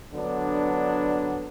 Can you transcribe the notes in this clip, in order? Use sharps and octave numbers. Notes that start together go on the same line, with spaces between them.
D3 F#3 B3 D4